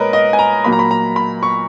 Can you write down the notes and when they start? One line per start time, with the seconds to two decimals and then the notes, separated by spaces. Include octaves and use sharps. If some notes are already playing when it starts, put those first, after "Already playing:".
Already playing: A#2 G#3 B3 A#4 B4 C#5 D#5
0.13 D#5
0.33 G#5
0.39 A#5
0.64 A#2 F#3 A#3 B5
0.72 A#5
0.79 B5
0.91 A#5
1.16 B5
1.43 C#6